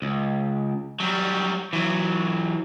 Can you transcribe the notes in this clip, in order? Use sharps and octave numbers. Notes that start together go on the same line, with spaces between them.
C#2
F#3 G3
E3 F#3